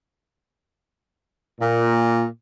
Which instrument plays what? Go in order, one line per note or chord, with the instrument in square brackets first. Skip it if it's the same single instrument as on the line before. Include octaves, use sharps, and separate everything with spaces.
[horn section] A#2